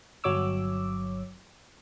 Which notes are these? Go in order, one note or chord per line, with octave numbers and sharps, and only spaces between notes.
G1 F#3 C#5 D6 E6